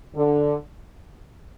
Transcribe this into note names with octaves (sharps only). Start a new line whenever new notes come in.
D3